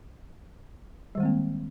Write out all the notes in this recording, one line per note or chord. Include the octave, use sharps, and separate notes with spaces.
D#3 G3 G#3 A#3 C4